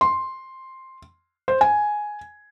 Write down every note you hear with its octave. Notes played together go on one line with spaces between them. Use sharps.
C6
C5
G#5